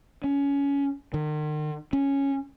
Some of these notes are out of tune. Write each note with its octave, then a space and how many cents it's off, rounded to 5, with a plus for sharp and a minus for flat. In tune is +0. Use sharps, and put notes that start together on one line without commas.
C#4 +20
D#3 -40
C#4 -5